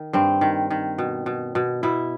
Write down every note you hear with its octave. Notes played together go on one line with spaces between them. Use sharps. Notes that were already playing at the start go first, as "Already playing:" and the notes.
Already playing: D#3
G2 C4
D#3
D#3
B2
B2
B2
B2 E4